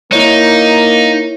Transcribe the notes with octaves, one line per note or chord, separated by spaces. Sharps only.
A#3 D#4 E4 C#5